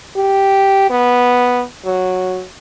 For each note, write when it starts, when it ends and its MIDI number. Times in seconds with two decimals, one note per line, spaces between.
0.16 0.88 67
0.90 1.63 59
1.85 2.43 54